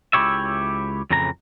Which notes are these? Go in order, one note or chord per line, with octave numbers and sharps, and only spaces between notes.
C#2 G2 E4 G4 C#5 E5
F2 A2 C#3 E3 A#5